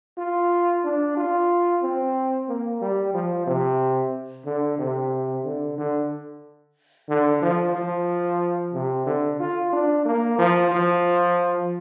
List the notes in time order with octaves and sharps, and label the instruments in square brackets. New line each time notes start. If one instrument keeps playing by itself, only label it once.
[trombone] F4
D4
F4
C4
A#3
G3
F3
C3
D3
C3
D3
D3
D3
F3
F3
C3
D3
F4
D4
A#3
F3
F3